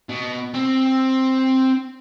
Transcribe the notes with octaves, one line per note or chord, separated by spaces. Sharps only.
B2
C4